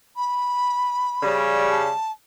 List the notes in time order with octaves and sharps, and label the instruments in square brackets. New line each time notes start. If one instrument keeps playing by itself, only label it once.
[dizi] B5
[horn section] C#3 G3
[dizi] A5